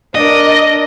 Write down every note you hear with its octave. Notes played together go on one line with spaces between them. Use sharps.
D4 A#4 D5 D#5